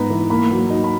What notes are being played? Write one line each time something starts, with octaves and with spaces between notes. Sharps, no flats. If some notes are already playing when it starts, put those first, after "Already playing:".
Already playing: G#2 B3 D#4 A#5 B5
E3
A#3 B5
F#3
D#4
B5